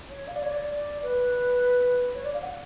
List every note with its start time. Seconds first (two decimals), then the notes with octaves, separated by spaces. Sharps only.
0.10 C#5
0.28 F5
0.36 D5
0.43 C#5
0.51 D5
1.03 B4
2.15 C#5
2.24 D5
2.34 F5
2.43 F#5